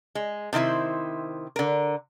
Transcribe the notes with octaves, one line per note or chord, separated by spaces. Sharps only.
G#3
C3 D#3 A3 E4 C5
D3 A#4